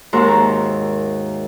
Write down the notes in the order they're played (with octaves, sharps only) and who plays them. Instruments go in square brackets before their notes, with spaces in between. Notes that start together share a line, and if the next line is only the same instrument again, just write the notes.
[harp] D#2 G#2 F#4 A#4 E5 C6